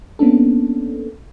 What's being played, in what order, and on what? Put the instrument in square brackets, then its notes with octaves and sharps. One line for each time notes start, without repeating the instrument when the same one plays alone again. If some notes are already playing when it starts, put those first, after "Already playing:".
[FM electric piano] A#3 B3 C#4 D4 A4